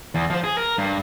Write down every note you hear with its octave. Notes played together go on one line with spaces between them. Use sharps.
E2
F3 C5
G#4
A#4
G2